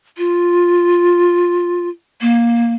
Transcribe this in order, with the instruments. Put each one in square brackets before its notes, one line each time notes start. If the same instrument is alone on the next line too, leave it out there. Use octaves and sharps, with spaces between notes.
[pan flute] F4
A#3